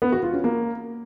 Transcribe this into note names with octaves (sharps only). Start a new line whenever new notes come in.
B3
F#4
F4
C#4
A#3